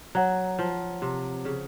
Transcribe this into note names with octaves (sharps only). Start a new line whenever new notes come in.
F#3 C#5 F#5 A#5
F3
C3
C#3